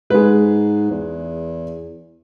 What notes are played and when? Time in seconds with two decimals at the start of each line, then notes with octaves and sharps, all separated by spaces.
0.10 G#2 G#3 B4
0.91 E2